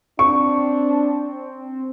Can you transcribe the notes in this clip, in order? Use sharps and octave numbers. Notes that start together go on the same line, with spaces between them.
C4 D4 C#6